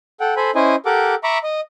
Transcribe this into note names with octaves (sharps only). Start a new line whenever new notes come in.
A4 F#5 G5
A4 C5 G#5 B5
C#4 E4 C5 D#5 G#5
G4 A4 A#4 F#5 D6
E5 A#5 B5 C#6 D6
D#5